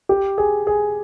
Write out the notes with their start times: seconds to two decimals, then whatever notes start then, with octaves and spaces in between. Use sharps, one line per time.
0.09 G4
0.38 G#4
0.67 G#4